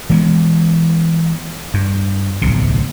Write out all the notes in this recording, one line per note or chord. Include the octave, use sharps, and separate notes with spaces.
E3 G#3 B3
G2
D1 B1 C3